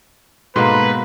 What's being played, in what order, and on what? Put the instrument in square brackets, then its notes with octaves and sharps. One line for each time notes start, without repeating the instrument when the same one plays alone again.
[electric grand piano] G#2 A4 C6 [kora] B2 A#3 [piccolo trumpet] B4